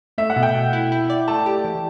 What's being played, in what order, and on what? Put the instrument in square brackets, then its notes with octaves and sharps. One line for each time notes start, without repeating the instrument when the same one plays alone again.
[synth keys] A3 [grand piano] E5
[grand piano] F#5
[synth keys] B2
[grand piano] G5
[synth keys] B2
E4
E4
D5
[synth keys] A3 [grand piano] A5
[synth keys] G4
E3